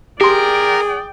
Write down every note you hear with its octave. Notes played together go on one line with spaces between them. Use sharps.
G4 G#4 A#4 D5 G5 C6